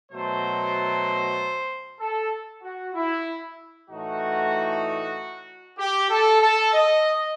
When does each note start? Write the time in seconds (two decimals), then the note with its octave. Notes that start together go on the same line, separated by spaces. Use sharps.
0.11 B2 F#3 A3 C5
2.00 A4
2.62 F#4
2.95 E4
3.89 A2 E3 A3 D#4 F#4
5.78 G4
6.10 A4
6.41 A4
6.73 D#5